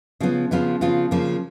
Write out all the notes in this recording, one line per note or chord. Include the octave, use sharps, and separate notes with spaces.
C#3 F3 B3 F4
C#3 F3 B3 F4
C#3 F3 B3 F4
C#3 F3 A#3